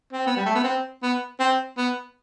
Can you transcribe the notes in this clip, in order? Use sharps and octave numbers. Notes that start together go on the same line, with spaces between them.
C4
B3
G3
A3
B3
C4
B3
C4
B3